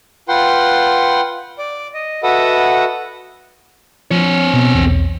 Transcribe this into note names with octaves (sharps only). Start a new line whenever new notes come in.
F4 B4 F#5 G5 C6
D5
D#5
F#4 A4 B4 D#5 E5 F#5
F3 C4 C#5
B2
B1 E2